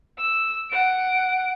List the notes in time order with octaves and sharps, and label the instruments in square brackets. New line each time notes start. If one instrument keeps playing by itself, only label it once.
[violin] E6
F#5 D7